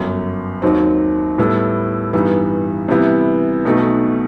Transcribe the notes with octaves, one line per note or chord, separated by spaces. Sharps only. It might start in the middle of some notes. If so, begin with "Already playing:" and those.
Already playing: G1 F#2 F#3
D#2 D#3 F#3 C4
A2 G3 B3 E4 A4
G2 E3 G3 B3 D#4
C3 E3 G3 B3 E4
B1 B2 A3 D#4 F#4